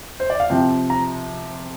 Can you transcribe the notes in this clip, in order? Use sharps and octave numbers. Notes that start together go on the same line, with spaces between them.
C5
D5
F5
C3 F3 G5
A#5